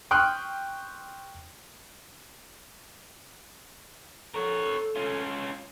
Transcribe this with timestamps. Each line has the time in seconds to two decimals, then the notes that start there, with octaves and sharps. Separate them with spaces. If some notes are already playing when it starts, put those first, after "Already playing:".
0.11 G5 C6 C#6 D#6 F6 F#6
4.34 A4 A#4 C#5
4.96 C#4 F4